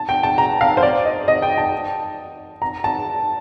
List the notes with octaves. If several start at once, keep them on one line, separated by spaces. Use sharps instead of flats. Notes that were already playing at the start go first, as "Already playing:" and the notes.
Already playing: A5
G5
A5
A#5
F5
C5
D5
D#5
D#5
G5
A5
A#5
A5